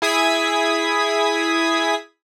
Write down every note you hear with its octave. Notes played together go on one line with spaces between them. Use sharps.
E4 G#4 D#6 G#6 B6